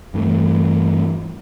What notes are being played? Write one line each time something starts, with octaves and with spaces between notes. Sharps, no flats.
G2 E3 A3